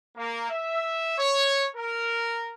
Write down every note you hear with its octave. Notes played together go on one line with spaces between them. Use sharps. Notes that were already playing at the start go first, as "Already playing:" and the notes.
A#3
E5
C#5
A#4